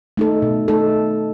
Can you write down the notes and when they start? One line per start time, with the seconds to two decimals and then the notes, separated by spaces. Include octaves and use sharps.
0.17 A3 D#4 A4
0.42 B2
0.68 A3 D#4 A4